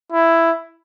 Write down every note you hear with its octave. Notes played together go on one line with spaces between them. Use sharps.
E4